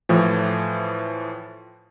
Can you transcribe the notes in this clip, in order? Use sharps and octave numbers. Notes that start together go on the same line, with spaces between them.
A2 E3 F3